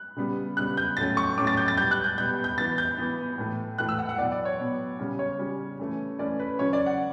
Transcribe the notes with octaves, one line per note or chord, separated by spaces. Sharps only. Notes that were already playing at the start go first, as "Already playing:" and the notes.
Already playing: F#6
C#3 G3 B3
C#3 G3 B3 F#6
G6
A2 F#3 A3 C#4 A6
C#6
A2 F#3 A3 C#4 D6
A6
G6
A6
B2 G3 B3 G6
F#6
G6
B2 G3 B3 G6
G6
E3 B3 A6
G6
E3 B3
A2 E3 A3
A2 E3 A3 F#6
E6
F#5
F#5
B2 F#3 B3 D5
D5
C#5
B2 F#3 B3
C#3 G3 C#4
C#5
C#3 G3 C#4
E3 A3 C#4
E3 A3 C#4 D5
B4
C#3 F#3 C#4 C#5
D5
F#5